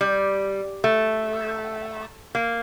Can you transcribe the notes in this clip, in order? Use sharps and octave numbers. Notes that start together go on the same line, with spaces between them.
G3
A3
A#3